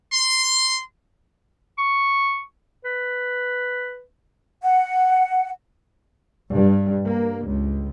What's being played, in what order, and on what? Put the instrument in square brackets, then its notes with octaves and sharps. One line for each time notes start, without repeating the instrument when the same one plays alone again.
[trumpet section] C6
[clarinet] C#6
B4
[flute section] F#5
[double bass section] G2
A#3
C#2